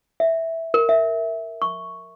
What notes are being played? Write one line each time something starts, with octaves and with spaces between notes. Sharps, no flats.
E5
A#4
E5
C#6